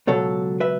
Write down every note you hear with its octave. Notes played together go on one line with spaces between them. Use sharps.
C#2 B2 F#3 A4 C#5
B4 E5